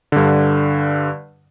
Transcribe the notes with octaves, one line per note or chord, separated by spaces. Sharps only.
G2 D3